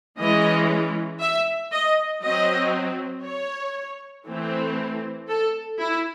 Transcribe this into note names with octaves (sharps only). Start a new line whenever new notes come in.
E3 G#3 C#4 D#5
E5
D#5
F#3 C4 D#5
C#5
E3 A3 C4
A4
E4